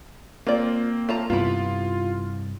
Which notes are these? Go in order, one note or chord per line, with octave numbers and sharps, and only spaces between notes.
A#3 C4 F4 D5
F4 A5 A#5
G2 C3 B3 E4 F4